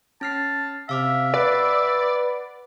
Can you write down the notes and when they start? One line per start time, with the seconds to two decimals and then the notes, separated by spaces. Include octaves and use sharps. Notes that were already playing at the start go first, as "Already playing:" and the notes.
0.21 C#4 A5 F6 C7
0.89 C3 E5 F5 D6 F6
1.34 B4 D5 F#5